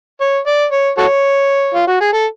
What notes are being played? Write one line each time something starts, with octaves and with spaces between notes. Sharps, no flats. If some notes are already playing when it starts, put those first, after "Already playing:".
C#5
D5
C#5
F#4 A4 C#5
F4
F#4
G#4
A4